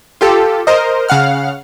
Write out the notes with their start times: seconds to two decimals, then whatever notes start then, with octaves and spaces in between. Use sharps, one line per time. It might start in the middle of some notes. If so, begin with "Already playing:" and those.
0.21 F4 G4 A4
0.67 A#4 C5 D#5
1.09 C#3 F5 F#5 F6